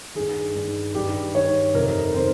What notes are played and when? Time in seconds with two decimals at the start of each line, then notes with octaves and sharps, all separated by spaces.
0.15 G2 D#3 G#4
0.55 G2 D#3
0.95 G2 D#3 G4
1.35 G2 D#3 C#5
1.74 F2 C3 D#3 A#4
2.14 C3 D#3 C5